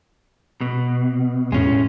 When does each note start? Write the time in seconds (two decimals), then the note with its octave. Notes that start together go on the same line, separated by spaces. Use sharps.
0.61 B2
1.52 E2 A2 G#3 C#4